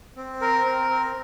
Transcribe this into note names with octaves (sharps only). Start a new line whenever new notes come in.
C4
A#4
C4
C4